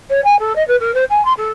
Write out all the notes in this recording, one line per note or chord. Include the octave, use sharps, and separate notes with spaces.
C#5
G#5
A4
D#5
B4
A#4
C5
G#5
C6
A4